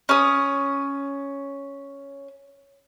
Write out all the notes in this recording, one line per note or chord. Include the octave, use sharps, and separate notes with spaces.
C#4 D#6